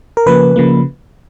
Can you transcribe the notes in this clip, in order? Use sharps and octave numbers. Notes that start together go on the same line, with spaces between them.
A#4
C#3 F3 A#3 B4
C#3 F3 A#3